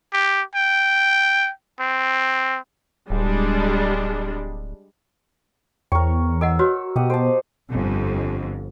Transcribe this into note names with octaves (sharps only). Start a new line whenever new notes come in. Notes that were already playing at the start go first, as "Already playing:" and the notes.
G4
G5
C4
D1 G3 G#3 D4
E2 A#4 C#5 G5
A4 D#5 F#5 E6
F#4 B4 C#5
B2 G4 D#5 F#5
A4 C5 A5
G1 F2